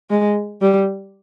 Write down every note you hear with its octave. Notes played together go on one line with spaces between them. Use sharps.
G#3
G3